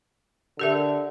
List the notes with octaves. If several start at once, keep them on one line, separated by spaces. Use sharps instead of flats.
D3 G4 A#4 E5